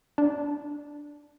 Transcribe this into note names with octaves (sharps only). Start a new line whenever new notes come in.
D4